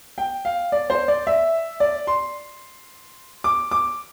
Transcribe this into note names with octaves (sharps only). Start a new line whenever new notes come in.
G5
F5
D5
C5
D5
E5
D5
C6
D6
D6